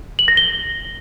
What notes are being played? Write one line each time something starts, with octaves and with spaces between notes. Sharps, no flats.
F#7
A#6
G7